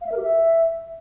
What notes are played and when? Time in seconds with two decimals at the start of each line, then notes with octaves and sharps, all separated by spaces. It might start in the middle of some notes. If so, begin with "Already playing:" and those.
0.01 F5
0.07 E5
0.12 A#4
0.17 G4
0.22 E5